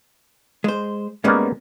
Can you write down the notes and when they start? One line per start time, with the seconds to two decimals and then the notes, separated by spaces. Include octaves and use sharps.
0.64 G#3 C5
1.24 G#2 G3 G#3 A#3 B3 C#4